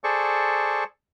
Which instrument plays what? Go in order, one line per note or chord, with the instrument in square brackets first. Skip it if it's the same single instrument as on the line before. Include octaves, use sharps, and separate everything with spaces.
[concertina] G#4 A4 C5 D5 C#6